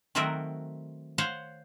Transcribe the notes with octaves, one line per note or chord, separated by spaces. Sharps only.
D#3 F#3 A3 C4 F#4 A#4
C5 C#5 F5 F#5